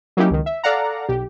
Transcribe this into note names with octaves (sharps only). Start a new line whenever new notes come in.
F#3 A#3 C#4 D#4 E4 G4
C#2 D#3
E5
A4 D5 F5 F#5 A#5
B1 G4